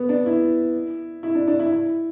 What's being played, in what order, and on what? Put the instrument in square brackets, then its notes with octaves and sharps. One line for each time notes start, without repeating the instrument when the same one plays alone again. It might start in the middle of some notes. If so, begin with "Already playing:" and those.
Already playing: [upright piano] B3
D4
E4
E4
D4
D4
E4
E4